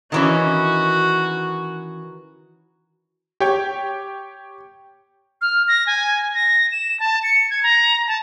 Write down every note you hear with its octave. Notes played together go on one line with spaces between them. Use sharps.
D#3 E3 C#4 F#4
G4 C#5 G5
F6
A#6
G#5
A#6
E7
A5
C#7
G#6
A#5
A5